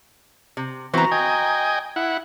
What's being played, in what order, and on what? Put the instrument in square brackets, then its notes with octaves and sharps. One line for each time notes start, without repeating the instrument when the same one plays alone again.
[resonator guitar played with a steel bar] C3
[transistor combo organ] E3 B3 C4 [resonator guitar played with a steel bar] F#4 A#5
[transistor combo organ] D#5 G5 G#5
E4 F#5